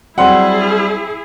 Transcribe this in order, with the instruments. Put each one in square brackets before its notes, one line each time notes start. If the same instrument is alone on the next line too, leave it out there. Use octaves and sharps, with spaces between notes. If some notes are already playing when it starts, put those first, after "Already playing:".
[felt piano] F#3 C4 [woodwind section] G3 [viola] E4 G#4 [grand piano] F#5 C6